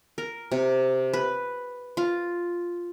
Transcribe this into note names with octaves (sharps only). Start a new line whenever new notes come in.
A#4
C3
B4
F4